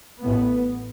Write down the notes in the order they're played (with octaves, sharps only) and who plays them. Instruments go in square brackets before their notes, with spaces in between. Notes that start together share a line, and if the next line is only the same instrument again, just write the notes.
[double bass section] A1 A2 B3